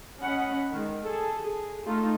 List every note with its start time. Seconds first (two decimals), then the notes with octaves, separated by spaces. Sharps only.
0.19 C#4 D#5 F#5 B5
0.72 D#3 G#3
1.02 G#4 A4
1.42 G#4
1.86 A3 D#4 F4